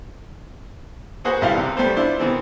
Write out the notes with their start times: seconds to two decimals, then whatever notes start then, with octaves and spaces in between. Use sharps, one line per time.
1.24 A#3 F#4 G#4 B4 C5 F#5
1.42 B1 G3 E4 F5
1.56 D#2 C3
1.77 G3 A3 B3 C5
1.96 D4 E4 F4 C5
2.20 B2 D#3 E3 B3 C4